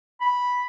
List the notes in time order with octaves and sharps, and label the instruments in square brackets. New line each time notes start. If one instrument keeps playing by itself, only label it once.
[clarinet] B5